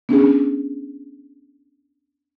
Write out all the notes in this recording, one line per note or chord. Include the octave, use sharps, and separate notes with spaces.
B3 C#4 D4 G#4